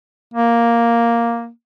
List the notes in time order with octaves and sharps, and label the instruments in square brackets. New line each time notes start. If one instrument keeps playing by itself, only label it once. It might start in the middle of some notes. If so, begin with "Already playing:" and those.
[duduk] A#3